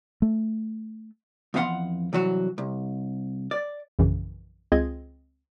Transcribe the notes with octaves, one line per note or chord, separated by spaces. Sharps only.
A3
F2 E3 B3 F5 F#5 C6
C2 E3 F#3 F#4
C2
D5
A#1 F#2 C#3 E3
C#2 C4 F4 G#4 D#5 G#6